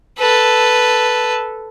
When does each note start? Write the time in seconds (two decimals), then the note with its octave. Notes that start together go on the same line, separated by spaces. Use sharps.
0.18 A4 B4